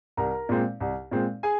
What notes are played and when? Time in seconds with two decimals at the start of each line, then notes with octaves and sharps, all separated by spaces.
0.17 C2 A#4 A#5
0.49 A#2 G#3 C4
0.80 C2
1.11 A#2 G#3 C4
1.43 G#4 G#5